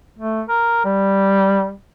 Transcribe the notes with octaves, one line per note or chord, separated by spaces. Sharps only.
A3
A#4
G3